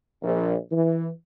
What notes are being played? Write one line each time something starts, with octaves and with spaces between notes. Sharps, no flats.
A#1
E3